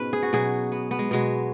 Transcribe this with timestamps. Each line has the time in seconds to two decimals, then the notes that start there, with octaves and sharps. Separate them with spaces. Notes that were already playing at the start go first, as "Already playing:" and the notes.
Already playing: G#2 B2 B3 C#4 B4
0.13 G#4
0.23 F#4
0.33 B2 F#3 G#4
0.72 B3
0.91 B3
0.99 G#3
1.11 B2 F#3 G#3